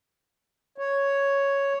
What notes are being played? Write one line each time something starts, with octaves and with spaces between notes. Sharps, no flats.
C#5